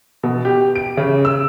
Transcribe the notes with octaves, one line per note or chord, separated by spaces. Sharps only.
B2
G4
D7
C#3
E6